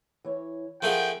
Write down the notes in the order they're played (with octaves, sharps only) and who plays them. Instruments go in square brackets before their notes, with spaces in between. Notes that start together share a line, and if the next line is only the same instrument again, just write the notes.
[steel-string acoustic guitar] E3 C#5
[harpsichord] F3 A3 G#4 [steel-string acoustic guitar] A#4 F#5 [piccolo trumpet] G5